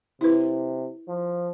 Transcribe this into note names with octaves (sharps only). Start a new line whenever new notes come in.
C3 E4 B4
F3